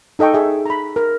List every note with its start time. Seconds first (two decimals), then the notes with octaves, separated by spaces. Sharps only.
0.19 D#4 A4 D#5 G5 C#6
0.34 G#4 E5
0.66 A#5 B5
0.96 A#4